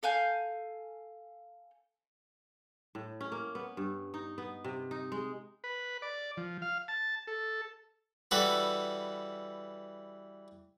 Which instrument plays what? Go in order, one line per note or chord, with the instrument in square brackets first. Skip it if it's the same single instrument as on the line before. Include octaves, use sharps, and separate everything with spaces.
[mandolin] A4 F5 G#5 G6
[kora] A2
C#4
A#3
B3
G2
D#4
B3
C3
D#4
G#3
[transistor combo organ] B4
D5
F3
F5
A5
A4
[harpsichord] E3 G3 F#4 A4 B4